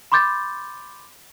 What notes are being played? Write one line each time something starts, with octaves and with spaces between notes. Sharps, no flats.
B5 C6 D6 G6 A6